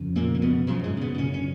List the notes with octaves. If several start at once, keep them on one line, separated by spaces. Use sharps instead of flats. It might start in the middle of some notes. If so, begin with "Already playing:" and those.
Already playing: F2 C#3
A#2 A#3
A#3
B2 B3
F#2 C#3 F3
G#2 G#3
B2 B3
C#3 C#4
C#4